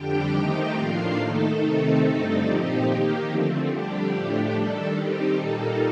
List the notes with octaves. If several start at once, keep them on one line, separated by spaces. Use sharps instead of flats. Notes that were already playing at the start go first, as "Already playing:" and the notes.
Already playing: F2 D3 G3 D4 G4 G5
D#3 A3 C4 D#4
A2 F3 A#3 D4 F4 F5
D#3 A3 D#4 A4
C3 D#3 A3 C4 D#4 A4
G2 D3 A3 C4 D#4
A#2 F3 C4 D#4 G4
D#3 A#3 D#4
D3 F3 A3 C4
F2 D3 G3 D4 G4
A2 F3 A3 D4
D#3 G3 D4 A4
D#3 G3 C4 D#4 G4
A#2 G3 A#3 D#4 A4